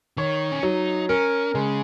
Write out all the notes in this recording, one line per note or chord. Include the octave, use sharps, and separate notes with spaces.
D#3 C#5
C#4
F#3 D#4
C#4 A#4
C#3 G#3